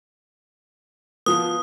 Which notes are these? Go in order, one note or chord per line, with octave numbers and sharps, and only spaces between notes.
F3 B3 D#6